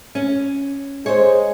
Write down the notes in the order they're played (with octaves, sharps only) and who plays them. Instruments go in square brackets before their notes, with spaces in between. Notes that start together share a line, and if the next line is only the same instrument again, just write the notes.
[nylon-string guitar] C#4
[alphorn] G#3 [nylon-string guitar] C5 C#5